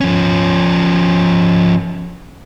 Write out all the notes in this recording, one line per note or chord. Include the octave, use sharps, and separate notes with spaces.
F3 C#4